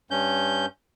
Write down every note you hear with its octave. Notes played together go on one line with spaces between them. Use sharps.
G2 C#4 G6